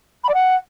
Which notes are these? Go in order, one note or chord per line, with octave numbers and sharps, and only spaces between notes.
B5
D5
F#5